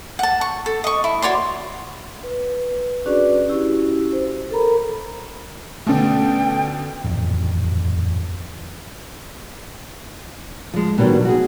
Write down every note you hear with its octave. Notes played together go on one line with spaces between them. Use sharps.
F#5 A5
C#6
A4
D#5 C#6
E4
F#4 C#5 D5 C6
B4
C#4 D4 F#4 G#4 B4 D5
C#4 E4 F#4 G4
C5
A4 A#4 A#5 B5
B2 D3 A3 C#4 G5
D#1 A1 F2
F3 G#3
B2 D#3 F#3 G3 D4
F#4 G#4